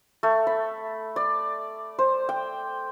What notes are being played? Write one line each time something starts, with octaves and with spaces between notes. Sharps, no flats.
A3
B5
D5
C5
G5